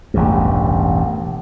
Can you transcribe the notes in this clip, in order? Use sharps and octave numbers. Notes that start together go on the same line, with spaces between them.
E1 A1 E2 G2